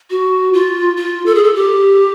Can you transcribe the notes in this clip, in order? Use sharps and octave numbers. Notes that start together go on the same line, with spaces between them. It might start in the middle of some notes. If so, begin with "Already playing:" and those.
F#4
F4
F4
A4
G#4
A4
G4